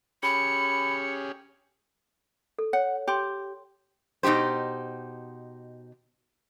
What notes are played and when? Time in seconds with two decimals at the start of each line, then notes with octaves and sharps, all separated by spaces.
0.23 C#4 G4 G#4 B5 C#7
2.59 A4
2.73 C#5 F#5
3.08 G4 G5 C6
4.23 B2 D#4 F#4 G4 C5